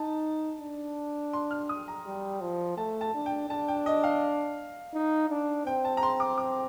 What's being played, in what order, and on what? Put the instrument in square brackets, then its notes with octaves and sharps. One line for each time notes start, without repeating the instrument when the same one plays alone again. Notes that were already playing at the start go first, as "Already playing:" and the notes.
Already playing: [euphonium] D#4 [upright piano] A5
[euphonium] D4
[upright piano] C6
F6
D#6
A#5
[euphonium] G3
F3
[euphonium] A3 [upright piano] A5
[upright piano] A5
[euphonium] D4
[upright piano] G5
[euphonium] D4 [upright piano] A5
[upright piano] G5
D#5
F5
[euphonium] D#4
D4
[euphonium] C4 [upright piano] G5
[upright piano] A5
A#5
C6
D6
D6